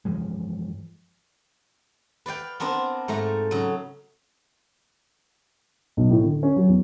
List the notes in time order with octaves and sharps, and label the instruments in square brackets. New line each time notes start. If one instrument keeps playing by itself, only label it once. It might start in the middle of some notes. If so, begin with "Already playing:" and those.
[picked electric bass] G2 E3 F3 G#3
[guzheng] B4 D5 F5 G5
B3 C4 D4 A#4 C5
G#2 A3 F5 A#5
C#3 F#3
[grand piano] B1
A2
D3
C#4
F#3
E2